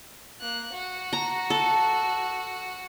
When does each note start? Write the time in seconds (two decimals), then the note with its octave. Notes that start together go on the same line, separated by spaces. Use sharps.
0.41 A#3 F#6
0.73 F#4
1.13 A#5
1.50 A4